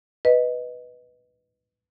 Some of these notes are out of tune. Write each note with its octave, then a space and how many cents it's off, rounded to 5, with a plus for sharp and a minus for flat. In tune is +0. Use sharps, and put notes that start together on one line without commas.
B4 +0 D#5 +0